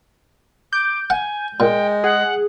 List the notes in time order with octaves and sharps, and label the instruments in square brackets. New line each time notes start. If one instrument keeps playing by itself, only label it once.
[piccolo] D6 [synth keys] G6
[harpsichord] F#5 [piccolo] G#5
[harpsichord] A#2 [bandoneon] G#3 [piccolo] G5
[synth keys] G#4 [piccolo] F#5